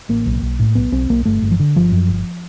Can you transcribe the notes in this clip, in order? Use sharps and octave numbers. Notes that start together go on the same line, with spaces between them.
A1 A#3
B1
B1
A2
B1 B3
B1 C4
B1 A#3
G1 A3
G1
F3
D3
G1 F3
F#2
G1